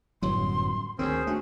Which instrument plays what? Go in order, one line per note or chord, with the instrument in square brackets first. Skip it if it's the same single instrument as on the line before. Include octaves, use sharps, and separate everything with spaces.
[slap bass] G1 F#2 F#3 [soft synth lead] A2 [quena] C6
[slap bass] D2 D#3 [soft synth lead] C4 [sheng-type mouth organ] C#4 G#4 C5
[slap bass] A3 [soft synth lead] D4 [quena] F#4